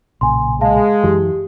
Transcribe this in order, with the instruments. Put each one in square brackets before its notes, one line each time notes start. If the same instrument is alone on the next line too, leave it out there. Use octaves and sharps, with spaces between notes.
[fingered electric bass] B1 A#2 C#3 [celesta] G#5 C6
[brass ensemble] G#3 [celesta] F5 A5
[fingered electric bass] F#2 E3 [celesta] G4